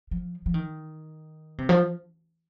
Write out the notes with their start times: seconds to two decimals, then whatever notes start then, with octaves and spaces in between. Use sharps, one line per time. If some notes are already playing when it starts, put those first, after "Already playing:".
0.11 F3
0.46 F3
0.54 D#3
1.58 C3
1.69 F3